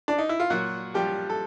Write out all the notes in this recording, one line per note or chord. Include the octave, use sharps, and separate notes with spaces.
D4
D#4
E4
F4
A#2 F#3 F#4
F3 G3 G4
A4